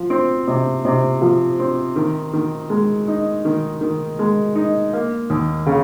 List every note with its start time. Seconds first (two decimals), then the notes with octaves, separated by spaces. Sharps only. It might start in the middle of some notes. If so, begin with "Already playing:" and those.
Already playing: F3
0.10 C4
0.48 C3
0.85 C3
1.22 F3
1.59 C4
1.96 D#3
2.33 D#3
2.70 G#3
3.08 D#4
3.45 D#3
3.81 D#3
4.19 G#3
4.55 D#4
4.93 A#3
5.30 D#2
5.66 C#3